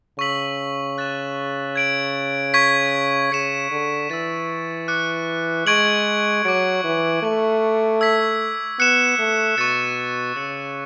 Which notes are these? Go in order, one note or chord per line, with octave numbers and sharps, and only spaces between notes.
C#3 C#6 E6 B6 F#7
F#6 A6 E7
G#6 D7 F#7
C#6 G#6 B6
C#3 G#6 C#7 E7
D3
E3 E6 A6 E7
D6 F#6 C#7
G#3 C#6 G#6 D7 F#7
F#3 D6 G#6 D7
E3
A3 G#6 D7 F#7
E6 G#6 B6
B3 F#6 C#7 E7
A3
B2 C#6 F#6 A6 C#7
C#3 E6 A6 C#7 E7